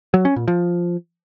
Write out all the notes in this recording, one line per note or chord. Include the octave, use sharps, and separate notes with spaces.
F#3
C#4
A#2
F3